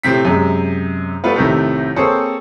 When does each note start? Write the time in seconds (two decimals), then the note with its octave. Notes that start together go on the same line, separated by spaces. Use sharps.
0.03 A2 C3 C4 B6
0.25 F#2 C3 G#3
1.24 G3 A3 B3 F4 B4
1.36 C2 A2 C3 D#3 A3
1.96 A#3 C4 G#4 A4 C5 C#5